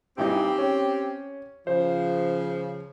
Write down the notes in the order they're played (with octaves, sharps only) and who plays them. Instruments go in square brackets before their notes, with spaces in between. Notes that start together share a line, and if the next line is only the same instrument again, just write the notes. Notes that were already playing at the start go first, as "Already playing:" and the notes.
[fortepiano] G2 E3 D#4 [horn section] C4 G4
[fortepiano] C#4
[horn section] C#3 F3 [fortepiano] C5